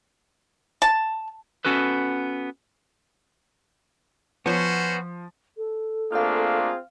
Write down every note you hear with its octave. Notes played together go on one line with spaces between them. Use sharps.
A5
B3 C#4 F#4 A4 B4
F3 B3 C#4 F#4 C5 C#5
A4
A3 A#3 C4 D4 F4 G#4 F5 F6